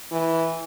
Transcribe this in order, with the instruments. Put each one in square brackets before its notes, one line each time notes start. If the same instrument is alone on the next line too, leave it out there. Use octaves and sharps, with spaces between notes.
[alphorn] E3